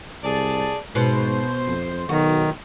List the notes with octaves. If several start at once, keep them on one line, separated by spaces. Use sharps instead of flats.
C2 G#4 D5 A5
G#2 B2 C5
F2
B1 D#3 F#4